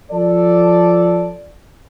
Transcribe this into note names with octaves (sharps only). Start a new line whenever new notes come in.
F3 A4 D5